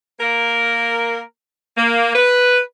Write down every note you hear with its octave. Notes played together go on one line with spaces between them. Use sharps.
A#3 A#4
A#3
B4